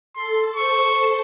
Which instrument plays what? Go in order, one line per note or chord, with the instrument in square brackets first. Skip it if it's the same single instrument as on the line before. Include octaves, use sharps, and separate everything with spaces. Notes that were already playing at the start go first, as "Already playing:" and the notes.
[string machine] A4 [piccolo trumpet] C6
[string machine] C5 [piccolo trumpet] C#6